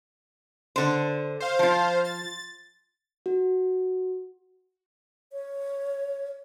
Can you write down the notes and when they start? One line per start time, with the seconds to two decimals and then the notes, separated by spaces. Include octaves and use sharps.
0.76 D3 C5
1.40 C5 F5
1.59 F3 F4
2.05 A6
3.26 F#4
5.32 C#5